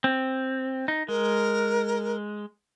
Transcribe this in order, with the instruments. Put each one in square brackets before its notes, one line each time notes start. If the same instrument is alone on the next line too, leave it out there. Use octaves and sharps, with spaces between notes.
[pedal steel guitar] C4
D#4
[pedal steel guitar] G#3 [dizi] A#4